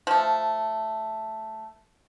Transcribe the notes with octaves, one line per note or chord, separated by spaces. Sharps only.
F3 A3